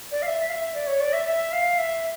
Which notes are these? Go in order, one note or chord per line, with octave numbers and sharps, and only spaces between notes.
D5
F5
E5
F5
E5
D5
C#5
D5
E5
E5
F5
E5